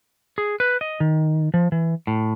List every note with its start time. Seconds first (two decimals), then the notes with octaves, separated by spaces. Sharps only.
0.38 G#4
0.60 B4
0.81 D#5
1.00 D#3
1.54 F3
1.72 E3
2.07 A2